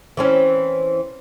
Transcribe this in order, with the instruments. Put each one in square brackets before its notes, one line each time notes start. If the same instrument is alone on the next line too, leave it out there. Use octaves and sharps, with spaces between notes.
[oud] E3 C4 C#4